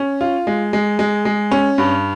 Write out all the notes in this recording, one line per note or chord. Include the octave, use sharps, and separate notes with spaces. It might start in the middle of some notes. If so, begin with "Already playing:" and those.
Already playing: C#4
F4
G#3
G#3
G#3
G#3
C#4
G2